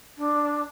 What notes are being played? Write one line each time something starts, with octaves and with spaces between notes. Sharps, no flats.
D4